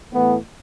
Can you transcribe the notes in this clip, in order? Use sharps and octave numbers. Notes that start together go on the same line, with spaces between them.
A2 E3 A3 B3